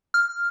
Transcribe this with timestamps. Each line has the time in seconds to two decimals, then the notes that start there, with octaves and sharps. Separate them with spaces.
0.14 F6